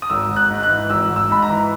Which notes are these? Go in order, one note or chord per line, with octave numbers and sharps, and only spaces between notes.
D#6
G#1 E6
G#1
F#6
G#2
F#6
E3
G#1 E6
G#1
E6
G#2 B5
A#5
E3